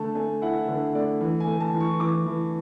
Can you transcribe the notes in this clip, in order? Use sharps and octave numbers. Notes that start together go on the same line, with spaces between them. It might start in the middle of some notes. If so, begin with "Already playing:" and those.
Already playing: D3 A3 A5
A3 G#5
E4 F#5
D3
A3 D5
E3
G#5
A3
A5
E3
C#6
E3 D6
E3